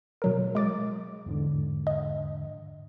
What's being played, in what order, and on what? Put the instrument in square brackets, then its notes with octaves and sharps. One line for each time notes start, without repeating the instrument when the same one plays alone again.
[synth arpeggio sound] B2 F#3 A#4
G#3 D6 A6
[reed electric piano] E2 G#2 D3
[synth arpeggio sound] D#5